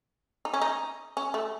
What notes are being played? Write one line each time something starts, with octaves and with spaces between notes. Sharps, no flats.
D#4
C#4
D#4
C#4
A3